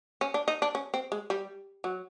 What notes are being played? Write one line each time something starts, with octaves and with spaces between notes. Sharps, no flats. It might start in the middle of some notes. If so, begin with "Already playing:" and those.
C#4
D4
D#4
D4
C#4
C4
G#3
G3
F#3